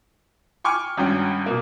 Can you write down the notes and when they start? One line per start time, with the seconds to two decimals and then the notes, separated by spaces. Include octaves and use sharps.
0.64 G5 G#5 C#6 D6 F6
0.97 G#1 G2 C#4 G5
1.46 B2 A#3